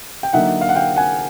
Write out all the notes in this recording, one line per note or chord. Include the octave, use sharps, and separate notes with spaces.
G5
D3 F#3 A#3 D#4 E5 F#5
F5
F#5
F5 G5
F#5 G#5